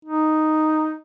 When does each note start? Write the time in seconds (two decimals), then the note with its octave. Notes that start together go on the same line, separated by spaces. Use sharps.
0.05 D#4